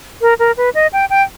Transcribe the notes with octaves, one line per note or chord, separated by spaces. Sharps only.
A#4
A#4
B4
D#5
G5
G5